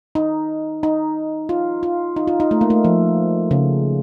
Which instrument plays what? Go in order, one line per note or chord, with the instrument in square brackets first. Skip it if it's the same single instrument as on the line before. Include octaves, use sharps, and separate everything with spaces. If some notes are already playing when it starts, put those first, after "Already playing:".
[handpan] D#4
D#4
F4
F4
D#4
F4
D#4
A3
A#3
A3
F3
C#3